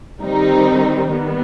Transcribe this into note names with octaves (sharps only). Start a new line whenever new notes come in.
D#3 G3 C4 D#4
D#3 G3 B3